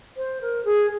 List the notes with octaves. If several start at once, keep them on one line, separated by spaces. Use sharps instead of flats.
C5
A#4
G#4